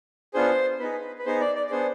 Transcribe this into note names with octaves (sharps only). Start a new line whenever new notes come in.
B3 D4 F4 G#4 C5
B3 D#4 G#4 B4
B4
B3 D#4 G#4 C5
D5
D5
D5
B3 D4 G#4 C5